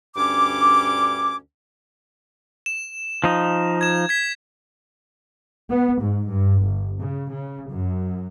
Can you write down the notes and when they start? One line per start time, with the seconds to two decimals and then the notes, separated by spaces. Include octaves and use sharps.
0.16 D2 G2 C#4 D6
2.66 E7
3.24 F3 D#4
3.81 G#6 E7
4.09 G#6 B6
5.71 B3
6.01 G#2
6.31 G2
6.66 G1
7.00 C#3
7.33 C#3
7.72 F#2